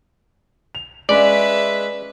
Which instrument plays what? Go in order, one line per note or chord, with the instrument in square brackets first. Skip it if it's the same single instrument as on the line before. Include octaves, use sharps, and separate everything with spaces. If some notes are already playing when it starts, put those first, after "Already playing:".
[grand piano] F7
[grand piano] G#3 C#4 [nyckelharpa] B4 E5 [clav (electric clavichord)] D5